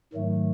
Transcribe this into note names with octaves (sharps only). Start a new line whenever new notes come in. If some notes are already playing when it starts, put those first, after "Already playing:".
G#2 D#3 F#3 A3